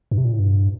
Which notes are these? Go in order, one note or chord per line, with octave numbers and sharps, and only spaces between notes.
G2
C3
A#2
A2
G2